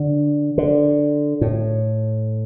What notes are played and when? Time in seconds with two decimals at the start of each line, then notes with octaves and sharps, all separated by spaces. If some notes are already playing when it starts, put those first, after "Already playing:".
Already playing: D3
0.58 D3
1.41 A2